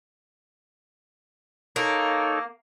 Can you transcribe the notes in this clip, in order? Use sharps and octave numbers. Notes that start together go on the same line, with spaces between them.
A#3 D#4 A4 C#5